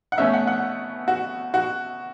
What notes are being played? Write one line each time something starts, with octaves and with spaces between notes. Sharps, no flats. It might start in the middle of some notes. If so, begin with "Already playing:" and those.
F#5
B2 A3 C#4 E5
F#5
F#5
F#4
F#4